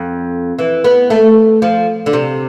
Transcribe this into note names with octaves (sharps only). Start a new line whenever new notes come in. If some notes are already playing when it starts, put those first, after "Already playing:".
Already playing: F2
E3
B3
A3
F3
D3
C3